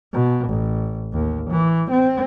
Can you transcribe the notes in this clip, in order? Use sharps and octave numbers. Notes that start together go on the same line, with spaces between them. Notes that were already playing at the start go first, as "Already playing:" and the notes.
B2
A1
D#2
E3
C4